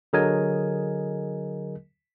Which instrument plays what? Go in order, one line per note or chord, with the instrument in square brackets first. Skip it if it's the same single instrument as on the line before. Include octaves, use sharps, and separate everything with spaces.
[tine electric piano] D3 F#3 G#4 A#4 D#5 G#5